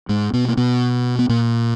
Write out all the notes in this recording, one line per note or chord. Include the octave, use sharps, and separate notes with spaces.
G#2 G#3
B2 B3
A#3
B2 B3
B3
A#2 A#3